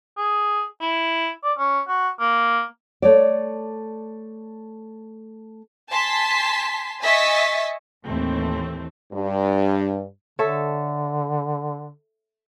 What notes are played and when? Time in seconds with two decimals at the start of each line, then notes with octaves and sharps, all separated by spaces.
0.18 G#4
0.81 E4
1.44 D5
1.58 C#4
1.88 F#4
2.20 A#3
3.02 A3 C#5 D5
5.90 G#5 A5 C6 B6
7.03 D#5 E5 G#5 C#6 A6 B6
8.06 D#2 A2 E3 A3 C4
9.12 G2
10.39 D3 A4 C#5 E5